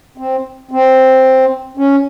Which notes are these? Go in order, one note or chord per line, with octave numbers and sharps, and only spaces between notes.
C4
C4
C#4